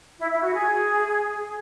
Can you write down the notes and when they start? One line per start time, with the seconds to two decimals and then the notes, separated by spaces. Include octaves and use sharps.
0.19 E4
0.31 E4
0.43 F#4
0.53 G#4